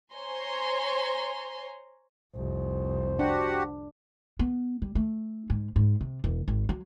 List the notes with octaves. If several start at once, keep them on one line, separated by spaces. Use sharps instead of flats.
C5 C#5 G#5 A#5 C6
F1 C2 C5
D4 F#4 G4 F#5
B3
G3
A3
G#2
G#2
C3
E1
G#1
F#3